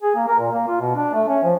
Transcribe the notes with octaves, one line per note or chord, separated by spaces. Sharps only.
G#4
A#3
A#4
A#2
A#3
F4
B2
D4
A3
C#4
F3